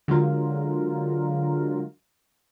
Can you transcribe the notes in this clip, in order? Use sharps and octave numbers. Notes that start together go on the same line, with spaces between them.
D3 F#3 G#3 F4 A#4